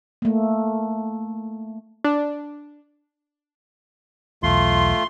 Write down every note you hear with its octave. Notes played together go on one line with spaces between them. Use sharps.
A3 A#3
D4
B1 E2 A3 F4 C6